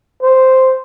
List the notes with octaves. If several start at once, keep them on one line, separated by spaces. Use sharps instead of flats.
C5